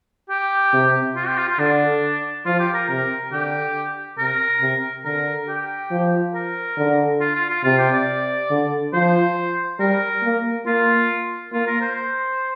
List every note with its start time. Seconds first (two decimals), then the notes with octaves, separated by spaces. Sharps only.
0.30 G4
0.73 C3
1.16 F4
1.27 G4
1.37 F4
1.49 F4
1.59 D3 D4
2.46 F3 F4
2.60 G4
2.74 A#4
2.89 C3 A#4
3.32 D3 G4
4.18 C3 A#4
4.61 C3
5.05 D3 A#4
5.48 G4
5.91 F3
6.35 A#4
6.77 D3
7.20 F4
7.35 F4
7.50 F4
7.64 C3 F4
7.78 G4
7.92 D5
8.50 D3
8.93 F3 C5
9.79 G3 A#4
10.23 A#3
10.66 A#3 F4
11.52 A#3 F4
11.67 A#4
11.81 C5
11.95 C5